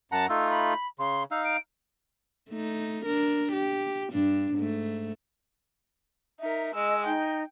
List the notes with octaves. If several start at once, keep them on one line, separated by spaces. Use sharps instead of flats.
F#2 F#5 A5 A#5
A3 D#4 F4 E6
B5
C#3 C6
D#4 F5 E6
D7
A3 D#4
D4 A#4
G4
G2 D4
G#2 A3
D#4 A#4 E5
G#3 D#5 E6
D#4 G5